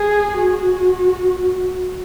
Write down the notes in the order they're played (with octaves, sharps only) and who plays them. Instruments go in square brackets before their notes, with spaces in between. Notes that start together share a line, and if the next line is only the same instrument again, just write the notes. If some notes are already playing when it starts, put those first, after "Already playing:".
Already playing: [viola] G#4
F#4